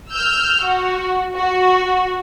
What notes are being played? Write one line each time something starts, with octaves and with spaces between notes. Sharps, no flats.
E6 F6 G6
F#4
F#4